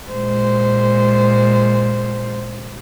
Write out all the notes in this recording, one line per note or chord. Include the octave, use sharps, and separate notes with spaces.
A#2 G#3 C5